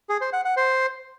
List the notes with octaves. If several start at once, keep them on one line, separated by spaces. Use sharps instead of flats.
G#4
C5
F#5
F#5
C5